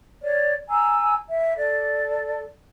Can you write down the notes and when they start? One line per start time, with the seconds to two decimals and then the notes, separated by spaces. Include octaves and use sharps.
0.22 C#5 D5
0.69 G#5 A#5 E6
1.29 E5
1.56 A4 D5